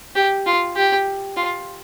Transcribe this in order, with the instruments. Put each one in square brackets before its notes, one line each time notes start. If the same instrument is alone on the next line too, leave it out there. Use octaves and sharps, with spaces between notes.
[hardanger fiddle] G4
F4
G4
F4